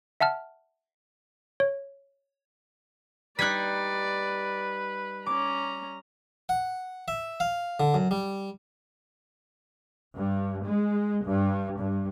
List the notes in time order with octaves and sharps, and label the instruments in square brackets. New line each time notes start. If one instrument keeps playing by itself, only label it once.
[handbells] E5 F#5 A5 F6
C#5
[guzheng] G3 D#4 [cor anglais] B4 [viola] D5 [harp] F#6 G#6 B6
[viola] C#4 A#5 [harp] D6
[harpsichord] F#5
E5
F5
D3
F#2
G3
[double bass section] G2
G#3
G2
G2